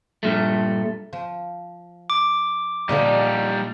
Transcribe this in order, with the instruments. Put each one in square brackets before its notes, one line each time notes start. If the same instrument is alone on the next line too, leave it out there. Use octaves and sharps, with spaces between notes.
[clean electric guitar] G2 A#2 A3
[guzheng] F3
[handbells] D6
[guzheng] A#2 D3 F3 [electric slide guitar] G3 D#4